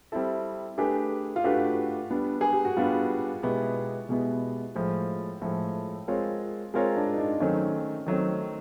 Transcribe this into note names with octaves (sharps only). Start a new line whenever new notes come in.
G3 C4 E4 A4
A3 D4 G4 G#4 B4
F4
A3 D4 F#4 G4 B4
G3 B3 D4
G#4
G4
F#4
G3 B3 D4 F4
B2 G#3 B3 E4 G4
B2 G#3 B3 E4 G4
A2 F3 G#3
A2 F3 G#3 A4
G#3 C4 F4 A#4 C#5
G#3 C4 F4 G#4 A#4 C#5
D4
D#4
D4
D#3 F#3 A3 C4 C#4
D#3 F#3 A3 C4